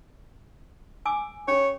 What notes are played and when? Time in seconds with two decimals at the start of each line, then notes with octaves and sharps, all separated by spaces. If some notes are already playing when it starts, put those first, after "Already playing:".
1.06 G#5 D6 E6
1.48 C#4 G#4 C#5